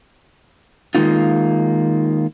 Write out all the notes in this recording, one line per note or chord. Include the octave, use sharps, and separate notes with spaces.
D#3 G#3 A#3 D#4 F4